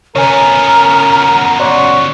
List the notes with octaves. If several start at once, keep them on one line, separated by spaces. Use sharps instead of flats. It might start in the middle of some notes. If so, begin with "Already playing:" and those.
C#3 B3 A#4 C#5 G#5 A#5
F#4 C#5 D5 C6